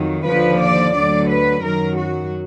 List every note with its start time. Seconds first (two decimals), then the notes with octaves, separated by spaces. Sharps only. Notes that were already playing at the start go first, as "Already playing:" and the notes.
Already playing: F2 D#3 F#3
0.26 D#2 D3 F3 B4
0.60 D5
0.94 D2 D3 F#3 D5
1.29 B4
1.63 F#2 D#3 F#3 A#4
1.97 F#4